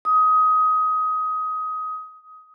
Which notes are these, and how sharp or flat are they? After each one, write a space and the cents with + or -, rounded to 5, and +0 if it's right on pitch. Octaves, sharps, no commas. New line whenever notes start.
D#6 +20